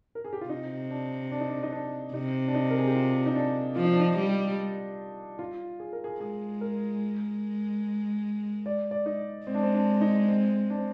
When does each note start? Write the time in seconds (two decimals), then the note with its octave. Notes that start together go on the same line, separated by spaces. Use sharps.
0.15 A#4
0.25 G#4
0.33 G4
0.41 F4
0.49 C3 D#4
0.90 D4
1.31 D4
1.41 D#4
1.49 D4
1.63 D#4
1.72 D4
2.14 C3 D#4
2.48 D4
2.54 D#4
2.70 A#4
2.78 G#4
2.87 G4
2.95 F4
3.26 D#4
3.35 D4
3.76 F3 F4
3.84 D#4
3.93 D4
4.00 D#4
4.18 G3
5.39 F4
5.80 G#4
5.93 A#4
6.04 G#4
6.20 G#3 G#4
6.61 A#4
8.66 D5
8.91 D5
9.06 D#4
9.47 G#3 C4
9.54 D4
9.63 C4
9.74 D4
10.01 D#4
10.28 C4
10.70 D4
10.77 C4